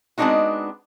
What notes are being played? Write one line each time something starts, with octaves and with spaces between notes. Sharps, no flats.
G#3 B3 C4 D4 D#4 F#4